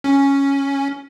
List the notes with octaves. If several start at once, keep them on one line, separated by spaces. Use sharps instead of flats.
C#4